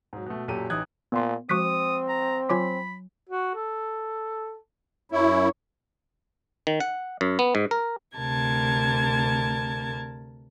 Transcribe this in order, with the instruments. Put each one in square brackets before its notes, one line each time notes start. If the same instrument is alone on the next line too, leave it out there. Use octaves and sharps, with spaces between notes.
[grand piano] G#2 F#3
B2 A3
F#2 A#2 G4 A4 D#7
A1 D#4 D#6 F#6 G#6
[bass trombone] A#2 [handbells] B3 C6
[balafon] F3 G#3 F#4 [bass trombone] C4 [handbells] C#6 F#6 B6 [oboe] D#6
[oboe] A#5
[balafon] F#3 G#5 C6 [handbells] F4 C#5 D6 [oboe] B5
[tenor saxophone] F#4
A4
[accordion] F#2 E4 [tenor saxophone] C#5
[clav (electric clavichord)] D#3
F#5
F#2
B3
G#2
A#4
[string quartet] D2 C3 A#4 A5 G#6